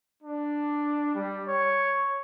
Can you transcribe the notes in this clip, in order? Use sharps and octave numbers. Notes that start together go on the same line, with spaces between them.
D4
G3
C#5